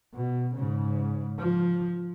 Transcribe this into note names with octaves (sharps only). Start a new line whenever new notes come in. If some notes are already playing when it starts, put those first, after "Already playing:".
B2
G#2 C#3
F3